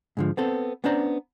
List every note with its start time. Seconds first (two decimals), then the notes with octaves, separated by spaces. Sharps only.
0.17 G#2 D3 F3
0.37 B3 C4 A4
0.84 B3 C#4 D4 C5 D5 A#5